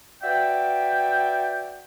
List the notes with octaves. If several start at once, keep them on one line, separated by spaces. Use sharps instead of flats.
F#4 B4 D5 E5 G5